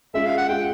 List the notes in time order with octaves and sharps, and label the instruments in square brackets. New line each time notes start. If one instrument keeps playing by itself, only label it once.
[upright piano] G#3 C#4 F4 [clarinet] E5
[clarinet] F5
F#5
[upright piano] G#3 C#4 F4 [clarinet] G5